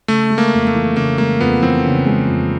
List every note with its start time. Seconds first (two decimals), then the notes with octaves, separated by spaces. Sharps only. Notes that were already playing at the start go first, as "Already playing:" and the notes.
0.08 C#3 A3
0.30 G#3
0.38 A#3
0.53 F2
0.67 A3
0.75 E3
0.96 C#3 A#3
1.18 G#3 A#3
1.40 F2 B3
1.62 E3 C4
1.84 C#3
2.06 G#3
2.28 F2